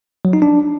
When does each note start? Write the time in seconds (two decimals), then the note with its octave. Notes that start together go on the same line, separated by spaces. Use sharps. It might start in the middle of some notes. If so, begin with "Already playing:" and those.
0.25 F#3
0.33 D#4
0.42 D4